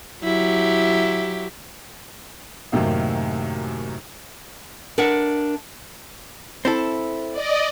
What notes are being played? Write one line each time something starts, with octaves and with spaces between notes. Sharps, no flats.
F#3 E4 G4
F#2 A2 C3 D#3 A#3
D4 A#4 E5 F#5
C4 E4 A4
D5 D#5